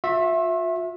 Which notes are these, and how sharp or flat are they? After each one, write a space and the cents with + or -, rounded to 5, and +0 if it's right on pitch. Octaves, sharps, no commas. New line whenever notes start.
F4 +45 E5 +0